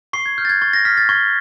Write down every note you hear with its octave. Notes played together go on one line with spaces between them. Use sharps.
C#6 C7
G#6
F6 G6
A6
G#6
C#6 A6
A#6
F6 B6
A6
C#6 G#6